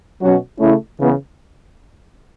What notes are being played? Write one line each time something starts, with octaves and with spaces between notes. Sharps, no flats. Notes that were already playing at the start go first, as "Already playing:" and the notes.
B2 F#3 C#4 F#4
C#3 A3 C#4 E4
C#3 E3 B3